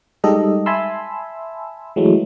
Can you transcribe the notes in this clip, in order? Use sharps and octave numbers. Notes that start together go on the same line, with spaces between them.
G3 G#3 D#4 G4 A4 D#5
E5 G#5 A5 B5 C6 E6
E3 F#3 G#3 A3